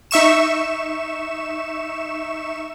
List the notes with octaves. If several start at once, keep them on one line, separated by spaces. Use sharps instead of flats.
D#4 E5 C#6 E7